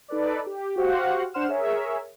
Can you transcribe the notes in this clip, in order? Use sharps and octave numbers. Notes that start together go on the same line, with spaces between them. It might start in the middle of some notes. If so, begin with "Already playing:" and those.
D#4 A4 B4 D5
G4
F#4 G4 C5 F5 F#5
D4 C5 F#5 C6 F6 E7
G#4 A#4 C#5 E5